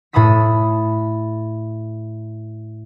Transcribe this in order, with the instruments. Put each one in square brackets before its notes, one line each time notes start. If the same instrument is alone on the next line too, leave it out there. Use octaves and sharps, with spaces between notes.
[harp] A2 A4 B5 D#6 B6